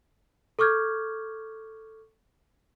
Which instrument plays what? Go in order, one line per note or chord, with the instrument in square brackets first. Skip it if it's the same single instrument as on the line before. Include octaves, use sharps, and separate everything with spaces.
[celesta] A4 C#6 D6 F6 G6 G#6